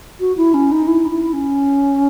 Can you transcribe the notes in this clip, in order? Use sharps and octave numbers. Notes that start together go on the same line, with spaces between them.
F#4
E4
C#4
D#4
E4
D#4
E4
C#4